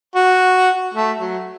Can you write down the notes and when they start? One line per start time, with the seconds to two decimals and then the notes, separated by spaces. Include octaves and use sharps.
0.16 F#4
0.94 A3
1.20 F#3